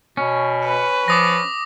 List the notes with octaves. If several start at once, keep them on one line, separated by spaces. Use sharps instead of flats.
B2 C#4
B4
F3 D6 D#6 A#6